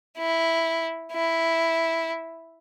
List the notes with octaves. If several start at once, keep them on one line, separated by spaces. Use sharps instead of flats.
E4
E4